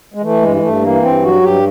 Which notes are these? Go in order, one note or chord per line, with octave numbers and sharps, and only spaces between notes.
G#3
E3 A3
G2 G#3
G#3
G2 A3
E3 A#3
G2 C4
F#3 F#4
G2 G4